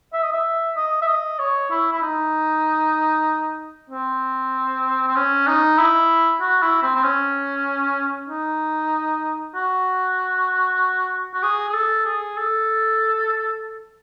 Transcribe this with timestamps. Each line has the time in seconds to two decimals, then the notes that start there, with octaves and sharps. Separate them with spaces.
0.13 E5
0.23 D#5
0.32 E5
0.76 D#5
1.02 E5
1.08 D#5
1.39 C#5
1.71 E4
1.93 E4
2.02 D#4
3.90 C4
5.07 C4
5.16 C#4
5.47 D#4
5.78 E4
6.41 F#4
6.62 E4
6.83 C4
6.95 C4
7.03 C#4
8.29 D#4
9.55 F#4
11.34 F#4
11.43 G#4
11.69 G#4
11.74 A4
12.06 G#4
12.37 A4